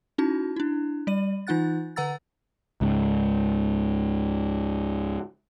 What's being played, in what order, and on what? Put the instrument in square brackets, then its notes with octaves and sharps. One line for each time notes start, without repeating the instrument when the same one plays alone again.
[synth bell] C#4 D#4 E4 F#4 A5
D4 E4
G3 D5 D#7
E3 D#4 F4 F#5 F#6 A6
D3 B4 F#5 A#5 E6 A6
[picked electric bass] C#2 G#2